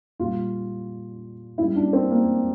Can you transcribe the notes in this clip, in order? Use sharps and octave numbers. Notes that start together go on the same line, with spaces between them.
A#2 G3 F4
A2 G3 E4
D4
C4
A#3